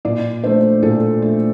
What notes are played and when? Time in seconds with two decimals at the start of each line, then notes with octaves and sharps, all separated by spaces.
0.05 A#2 D5
0.44 A3 D4 C5
0.83 A#2 A4
1.22 A3 D4